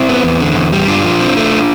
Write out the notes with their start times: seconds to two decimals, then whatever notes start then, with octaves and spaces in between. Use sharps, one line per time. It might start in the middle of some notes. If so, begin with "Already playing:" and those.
Already playing: C4 E4
0.09 B3
0.24 E2
0.40 D3
0.56 E2
0.73 G3
0.88 G2 D4 F4
1.04 F3
1.20 C4
1.37 A3